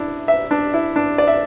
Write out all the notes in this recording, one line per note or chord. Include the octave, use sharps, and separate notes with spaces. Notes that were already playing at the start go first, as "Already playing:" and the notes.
Already playing: D4 E4
E5
D4
E4
D4
D5
E5